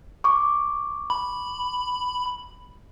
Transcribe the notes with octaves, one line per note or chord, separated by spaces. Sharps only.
C#6 D6
B5